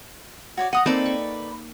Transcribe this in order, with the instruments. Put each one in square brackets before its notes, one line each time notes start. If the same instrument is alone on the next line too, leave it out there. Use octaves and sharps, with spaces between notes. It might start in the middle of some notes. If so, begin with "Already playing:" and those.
[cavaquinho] F#4 C#5 D5
[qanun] D#5 A#5 [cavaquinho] F#5 D#6
[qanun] A#3 C4 D#4 [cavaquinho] A4 B4 D5
[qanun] C#6